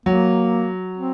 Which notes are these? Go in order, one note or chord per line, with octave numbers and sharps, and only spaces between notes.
F#3 A#3
C4